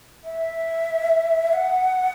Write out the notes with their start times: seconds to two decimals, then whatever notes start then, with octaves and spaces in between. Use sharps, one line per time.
0.24 E5
1.53 F#5